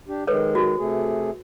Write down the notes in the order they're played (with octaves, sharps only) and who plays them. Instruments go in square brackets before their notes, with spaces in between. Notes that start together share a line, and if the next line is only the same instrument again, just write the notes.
[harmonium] D4 G4
[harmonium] D#3 G#3 [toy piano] A4 B4 C#5
[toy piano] F#4
[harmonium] C3 A3 G#4